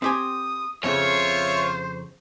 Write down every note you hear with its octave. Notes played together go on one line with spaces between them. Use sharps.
C4 G4 G#5 D#6
F2 C#3 F4 C5 C#5 E5